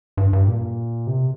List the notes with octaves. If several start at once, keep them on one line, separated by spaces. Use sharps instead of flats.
G2
G2
A#2
C3